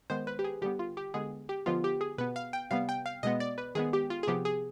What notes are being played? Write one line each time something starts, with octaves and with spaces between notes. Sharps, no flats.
D#3 G#3 B3 C5
B4
G4
G#4
D3 G3 B3 G4
F4
G4
D3 G#3 B3 G#4
G4
D3 F3 G#3 B3 F4
G4
G#4
B2 B3 B4
F5
G5
C3 G3 B3 F5
G5
F5
B2 G#3 B3 D#5
D5
B4
D#3 G#3 B3 G#4
G4
F4
G#4
C3 F3 B3 G4
G#4